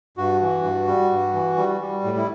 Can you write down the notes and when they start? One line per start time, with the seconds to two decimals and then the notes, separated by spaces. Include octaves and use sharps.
0.17 G2 F#4
0.41 E3
0.63 G2
0.88 G3
1.11 G2
1.34 E3
1.57 G3
1.81 G3
2.04 A2
2.17 E4